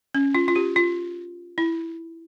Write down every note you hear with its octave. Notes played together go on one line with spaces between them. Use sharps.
C#4
F4
F4
G4
F4
E4